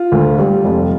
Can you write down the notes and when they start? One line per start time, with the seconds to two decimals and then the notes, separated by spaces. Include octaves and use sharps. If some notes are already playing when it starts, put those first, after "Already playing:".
Already playing: F4
0.12 D2
0.38 G3
0.64 F1